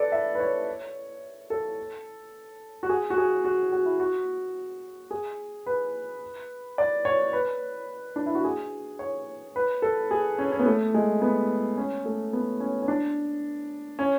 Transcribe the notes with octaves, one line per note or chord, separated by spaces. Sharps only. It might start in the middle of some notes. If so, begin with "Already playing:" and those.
Already playing: A4 B4 D5
E5
B4
C#5
A4
F#4
G#4
F#4
G#4
F#4
F#4
E4
F#4
G#4
B4
D5
C#5
B4
D4
E4
F#4
G#4
C#5
B4
A4
G#4
C#4
C#4
B3
A3
G#3
B3
C#4
A3
B3
C#4
C#4
D4
C#4